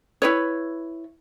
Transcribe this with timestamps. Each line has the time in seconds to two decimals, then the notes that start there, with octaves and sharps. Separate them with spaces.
0.22 E4 B4 C#5